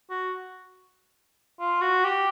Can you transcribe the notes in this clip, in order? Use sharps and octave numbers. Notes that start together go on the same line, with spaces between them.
F#4
F4
F#4
G4